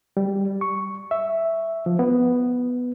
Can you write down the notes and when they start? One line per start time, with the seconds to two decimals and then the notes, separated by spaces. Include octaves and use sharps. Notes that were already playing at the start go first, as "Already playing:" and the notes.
0.17 G3
0.61 C#6
1.11 E5
1.86 F3
1.99 B3